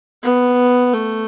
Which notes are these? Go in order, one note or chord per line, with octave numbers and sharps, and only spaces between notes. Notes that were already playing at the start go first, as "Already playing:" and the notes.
B3
A3